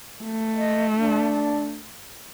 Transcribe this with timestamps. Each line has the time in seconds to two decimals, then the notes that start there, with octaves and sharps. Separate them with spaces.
0.24 A3
0.55 D#5
0.95 D4